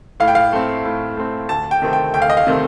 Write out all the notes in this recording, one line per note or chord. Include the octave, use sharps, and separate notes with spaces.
A2 F5
G5
F5
A3 C4
A2
A3 C4
D2 A5
G5
C3 D#3 A3 C4
G5
D2 G5
F5
D#5
F5
C3 D#3 A3 C4